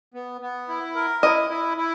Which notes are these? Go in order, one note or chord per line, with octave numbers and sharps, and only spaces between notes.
B3
B3
E4
A#4
E4 D#5
E4
E4